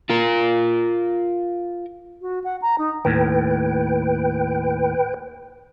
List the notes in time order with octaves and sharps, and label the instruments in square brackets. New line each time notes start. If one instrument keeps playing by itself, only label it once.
[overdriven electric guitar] F4 A#4
[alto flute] F#4
F#5
A#5
D#4
[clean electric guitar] D#2 A2 [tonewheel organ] B4 G5